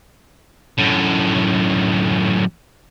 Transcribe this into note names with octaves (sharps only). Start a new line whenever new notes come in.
F#2 A2